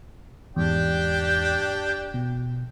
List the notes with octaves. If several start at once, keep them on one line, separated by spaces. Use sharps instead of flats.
E2 G#2 D4 G4 G5
B2